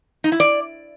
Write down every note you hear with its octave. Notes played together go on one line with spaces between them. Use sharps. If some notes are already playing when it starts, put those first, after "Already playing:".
D#4
E4
D5